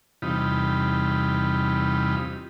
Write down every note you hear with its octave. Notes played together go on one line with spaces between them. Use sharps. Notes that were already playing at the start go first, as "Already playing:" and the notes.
E2 C3 G3 D#4 F4 B5